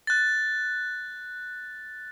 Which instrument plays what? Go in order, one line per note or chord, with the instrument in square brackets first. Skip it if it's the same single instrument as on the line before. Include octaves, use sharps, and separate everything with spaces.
[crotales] F#6 A6